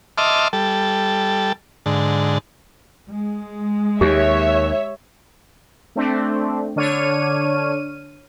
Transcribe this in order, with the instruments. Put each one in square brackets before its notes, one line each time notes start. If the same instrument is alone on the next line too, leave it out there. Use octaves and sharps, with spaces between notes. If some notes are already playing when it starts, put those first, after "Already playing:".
[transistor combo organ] D#5 E5 A5 C6 D6 F6
G3 A4
G#2 D3
[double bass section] G#3
[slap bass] D#2 [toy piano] G4 [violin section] C#5 E5
[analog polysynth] A3 C4 D4
D3 D4 C#5 F6 D#7